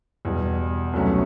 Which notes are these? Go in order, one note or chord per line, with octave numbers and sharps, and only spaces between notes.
E2 B2 G3
C2 B2 F#3 A3 C#4